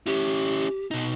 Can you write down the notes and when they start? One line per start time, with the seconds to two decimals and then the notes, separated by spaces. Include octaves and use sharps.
0.06 C#4 E4 G4
0.91 B2 D#4